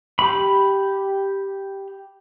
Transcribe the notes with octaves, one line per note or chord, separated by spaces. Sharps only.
G4 B5